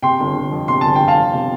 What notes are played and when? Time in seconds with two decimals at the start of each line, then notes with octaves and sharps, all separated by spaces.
0.02 C3 G5 C6
0.20 G1
0.36 G1
0.52 F2
0.68 C3 C6
0.81 G1 A5
0.95 G5
1.00 G1
1.08 F5 A5
1.17 F2
1.34 C3